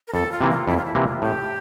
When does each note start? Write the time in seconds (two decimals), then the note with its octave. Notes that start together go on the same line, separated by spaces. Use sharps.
0.08 A#4
0.13 F2 A4
0.32 F4
0.41 C3 E3 A#3
0.50 F4
0.67 F2 E4
0.77 F4
0.85 E4
0.95 C3 E3 A#3
1.03 F4
1.22 A2 G4